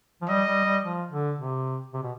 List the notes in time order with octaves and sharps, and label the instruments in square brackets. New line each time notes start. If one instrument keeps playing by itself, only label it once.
[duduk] F3
[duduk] G3 [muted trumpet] D#5
[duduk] G3
G3
F3
D3
C3
C3
B2